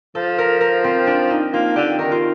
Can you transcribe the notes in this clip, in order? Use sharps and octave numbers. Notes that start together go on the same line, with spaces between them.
F3 A4
A#4
A#4
C4
D4
D#4
A#3 F4
D3 G4
D#3 A#4
F4